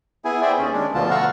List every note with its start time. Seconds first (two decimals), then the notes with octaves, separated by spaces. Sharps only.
0.25 B3 E4 G#4 G#5
0.42 G#4 C5 D5 E5 G5
0.58 D#2 C#4
0.73 G#3 D4
0.95 D2 B2 D3 F3 F4 A5
1.11 F5 F#5 A#5 C#6 E6